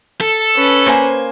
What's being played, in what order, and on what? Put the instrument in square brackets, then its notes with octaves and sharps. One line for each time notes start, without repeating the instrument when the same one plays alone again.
[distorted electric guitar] A4
[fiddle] C#4 B4
[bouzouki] A#3 C5 G#5